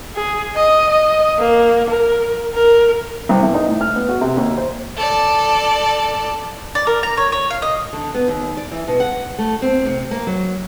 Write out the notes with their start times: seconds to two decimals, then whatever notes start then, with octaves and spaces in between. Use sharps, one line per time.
0.15 G#4
0.55 D#5
0.90 D#5
1.39 A#3
1.90 A#4
2.55 A#4
3.29 C2
3.42 E2
3.54 D#4
3.68 A2
3.81 F6
3.96 B3
4.09 F#4
4.21 C3
4.37 D#2
4.57 C5
4.97 A4 D5
6.75 D5
6.87 A#4
7.03 A#5
7.17 C#5
7.32 C#5
7.51 F5
7.62 D#5
7.93 D3
8.14 B3
8.28 D#2
8.57 D5
8.72 E3
8.88 B2
9.00 F#5
9.38 A3
9.62 C4
9.86 C3
10.11 A#3
10.27 F#3